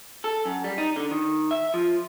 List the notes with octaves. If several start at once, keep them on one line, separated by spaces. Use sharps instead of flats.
A4
F#2
G3
D#4
D3
D#3
E5
F3